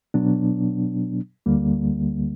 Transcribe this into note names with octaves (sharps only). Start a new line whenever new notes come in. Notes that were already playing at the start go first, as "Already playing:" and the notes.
B2 F#3 B3 D4
D2 D3 G3 A#3